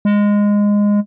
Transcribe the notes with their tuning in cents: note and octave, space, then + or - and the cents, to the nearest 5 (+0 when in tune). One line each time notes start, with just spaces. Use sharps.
G#3 -15